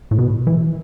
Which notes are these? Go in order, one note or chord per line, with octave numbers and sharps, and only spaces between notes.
A2
B2
E3